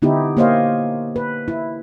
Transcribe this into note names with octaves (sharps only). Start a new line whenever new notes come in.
D3 B3 D#4 E4 G4
A#3 G4 C5 C#5 D#5 F5
B4
E4